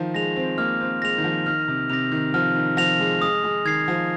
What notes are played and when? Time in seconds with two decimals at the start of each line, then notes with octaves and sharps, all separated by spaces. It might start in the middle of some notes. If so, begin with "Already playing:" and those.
Already playing: D#3 F3
0.14 G#3 A#6 F7
0.36 C4
0.58 A#3 F6
0.81 C4
1.02 G#3 A#6 F7
1.18 D#3
1.24 F3
1.46 D#3 F6
1.68 C3
1.90 C3 A#6 F7
2.12 D#3
2.34 F3 F6
2.56 D#3
2.77 F3 A#6 F7
3.00 G#3
3.21 G#3 D#6
3.44 G#3
3.65 D#3 G#6 C7
3.88 F3